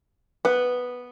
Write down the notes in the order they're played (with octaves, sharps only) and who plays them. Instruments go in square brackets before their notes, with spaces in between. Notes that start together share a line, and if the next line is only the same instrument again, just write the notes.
[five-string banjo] B3 B4